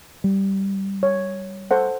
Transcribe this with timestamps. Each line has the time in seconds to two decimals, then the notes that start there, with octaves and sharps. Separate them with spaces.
0.24 G3
1.03 C#5
1.71 A4 C5 F#5